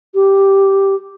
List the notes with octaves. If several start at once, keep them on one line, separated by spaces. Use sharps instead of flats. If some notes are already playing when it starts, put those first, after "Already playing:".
G4